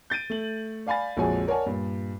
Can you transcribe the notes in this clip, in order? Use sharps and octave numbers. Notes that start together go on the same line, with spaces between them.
G6 A6 D7 D#7
A3 F#7
D5 F5 G#5 B5 A6
A#1 F2 G#3 F#4 C#5 G#5
A#4 C#5 D5 F#5 G#5 A5
G2 A#2